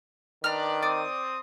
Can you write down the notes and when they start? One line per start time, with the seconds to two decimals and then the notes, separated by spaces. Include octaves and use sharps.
0.44 D#3 D4 B4 D5 A#5 F6
0.83 C4 D5 D#6